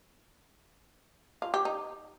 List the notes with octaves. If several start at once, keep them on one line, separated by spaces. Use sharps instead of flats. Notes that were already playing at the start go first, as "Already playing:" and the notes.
F4
G4
D#4